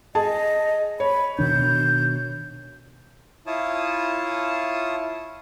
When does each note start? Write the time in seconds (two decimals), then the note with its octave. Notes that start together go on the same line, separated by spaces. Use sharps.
0.15 G#4 D#5 A5
1.00 C#5 B5
1.39 B2 D#3 D4 G6
3.47 E4 F4 C#5 A5 D#6